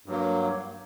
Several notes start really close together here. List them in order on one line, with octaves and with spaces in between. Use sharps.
G2 F#3 A#3